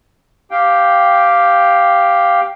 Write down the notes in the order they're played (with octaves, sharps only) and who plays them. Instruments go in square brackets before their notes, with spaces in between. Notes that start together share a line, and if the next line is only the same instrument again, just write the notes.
[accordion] G4 F5 G5